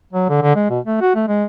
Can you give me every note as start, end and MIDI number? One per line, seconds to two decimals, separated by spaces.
0.13 0.27 54
0.29 0.38 50
0.42 0.56 50
0.56 0.69 56
0.70 0.79 47
0.85 1.01 57
1.01 1.11 66
1.15 1.24 57
1.28 1.45 56